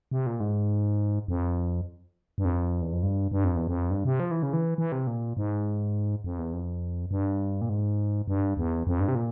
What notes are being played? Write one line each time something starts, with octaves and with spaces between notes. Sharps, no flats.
C3
A#2
G#2
F2
G2
F2
E2
F2
G2
G2
F2
E2
F2
G2
C3
F3
E3
C#3
E3
E3
C3
A#2
G#2
F2
E2
F2
G2
A#2
G#2
G2
E2
F2
G2
C3
A#2